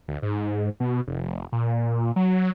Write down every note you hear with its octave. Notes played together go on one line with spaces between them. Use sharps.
D2
G#2
B2
F1
F1
A#2
F#3